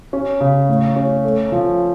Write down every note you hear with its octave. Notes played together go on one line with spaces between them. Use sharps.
C#4
C#3
A2
C#4
A3
F3